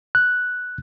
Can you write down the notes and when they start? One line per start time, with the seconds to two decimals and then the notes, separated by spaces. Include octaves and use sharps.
0.15 F#6